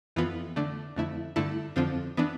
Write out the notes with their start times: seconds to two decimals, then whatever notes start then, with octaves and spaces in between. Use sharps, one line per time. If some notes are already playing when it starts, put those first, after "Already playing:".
0.16 F2 E3 B3 F4 B4
0.56 D3 A3 D4
0.96 F2 D3 A3 E4
1.36 G2 D3 A3 E4 A4
1.76 F2 D3 F3 C4 F4
2.17 E3 B3 D4